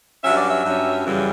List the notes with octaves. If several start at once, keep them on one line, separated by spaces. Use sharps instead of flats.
G2 F#3 C#4 E5
D5
E5
G2 F#3 C#4
F#2 C#3 E3 G3